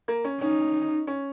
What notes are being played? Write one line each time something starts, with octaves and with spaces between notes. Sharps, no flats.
A#3
C#4
C#4 D#4
C#4